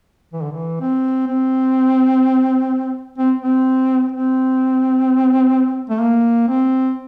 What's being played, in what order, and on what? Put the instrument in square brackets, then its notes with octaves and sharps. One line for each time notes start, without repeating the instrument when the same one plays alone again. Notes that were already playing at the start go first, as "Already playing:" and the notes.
[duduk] E3
D3
E3
C4
C4
C4
C4
C4
A3
A#3
C4